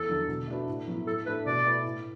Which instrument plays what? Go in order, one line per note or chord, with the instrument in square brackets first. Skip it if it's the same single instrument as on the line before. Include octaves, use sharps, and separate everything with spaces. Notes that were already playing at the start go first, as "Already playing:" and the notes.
Already playing: [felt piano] E2 [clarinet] A4
[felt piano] D3 F#3 D4
B2
A3 D4 F#4 B4
A2
F#3 B3 E4
[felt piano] A2 [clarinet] A4
[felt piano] A3 D4 A4 [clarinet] B4
[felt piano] B2 [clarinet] D5
[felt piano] A3 E4 B4
A2